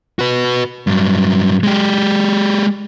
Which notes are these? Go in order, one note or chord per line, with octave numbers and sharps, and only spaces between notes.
F#4 B4
G2 F#3
G#3 G4